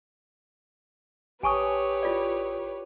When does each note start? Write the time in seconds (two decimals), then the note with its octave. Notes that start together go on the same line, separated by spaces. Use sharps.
1.43 A1 G4 B4 C#5 G#5 A5 C#6 D#6
2.03 E4 F4 D5